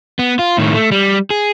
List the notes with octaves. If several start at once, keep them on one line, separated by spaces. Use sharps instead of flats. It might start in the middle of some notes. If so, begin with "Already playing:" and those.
B3
F4
A2 D#3
A3
G3
G#4